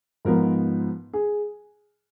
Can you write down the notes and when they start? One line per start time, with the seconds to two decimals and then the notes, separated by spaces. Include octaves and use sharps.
0.25 G#2 F3 B3 A#4
1.13 G#4